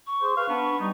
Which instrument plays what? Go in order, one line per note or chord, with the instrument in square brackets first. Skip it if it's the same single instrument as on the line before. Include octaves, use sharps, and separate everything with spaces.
[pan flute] C#6
[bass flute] G#4 [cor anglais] C5
[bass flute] B4 [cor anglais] F5 [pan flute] C#6
[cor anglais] B3 [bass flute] D4
[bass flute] G3 [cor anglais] D#4